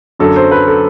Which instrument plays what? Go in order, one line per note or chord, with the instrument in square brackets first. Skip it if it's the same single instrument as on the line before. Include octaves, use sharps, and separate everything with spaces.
[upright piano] F#2 D3 F#3 A4
C5
B4
A4